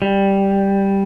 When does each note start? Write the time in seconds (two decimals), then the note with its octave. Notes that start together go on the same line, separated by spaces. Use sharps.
0.02 G3